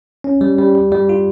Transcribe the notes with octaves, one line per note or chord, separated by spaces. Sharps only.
C#4
G3
G3
G3
G3
F4